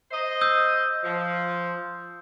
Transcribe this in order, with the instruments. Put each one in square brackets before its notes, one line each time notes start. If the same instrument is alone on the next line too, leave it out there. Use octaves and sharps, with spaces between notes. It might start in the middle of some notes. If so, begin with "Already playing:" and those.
[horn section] C5 D#5
[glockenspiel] D#6 E6 G6
[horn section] F3